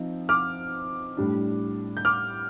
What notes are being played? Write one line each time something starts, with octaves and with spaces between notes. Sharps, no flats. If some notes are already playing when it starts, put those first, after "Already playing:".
Already playing: F3 C4 D#4
D6 F6
A2 G3 D4
G6
D6 F6